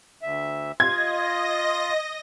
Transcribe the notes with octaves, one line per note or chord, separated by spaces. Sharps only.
D2 E5
F4 D#5 G#6 A#6